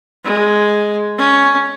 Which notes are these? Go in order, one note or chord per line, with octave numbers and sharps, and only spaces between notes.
G#3
C#4